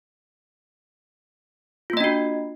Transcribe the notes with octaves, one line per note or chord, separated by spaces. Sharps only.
A#3 D4 F4 F#4 D#5